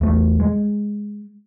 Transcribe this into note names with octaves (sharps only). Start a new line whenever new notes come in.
E2 A3
G#3